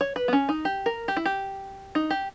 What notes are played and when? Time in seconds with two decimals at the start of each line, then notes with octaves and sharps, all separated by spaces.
0.01 C#5
0.16 B4
0.28 B3
0.33 C#4
0.49 D#4
0.65 G4
0.86 A#4
1.08 G4
1.17 E4
1.26 G4
1.95 D#4
2.10 G4